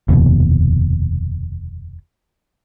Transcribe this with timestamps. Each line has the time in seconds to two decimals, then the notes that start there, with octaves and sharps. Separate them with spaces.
0.09 F1 D#2 B2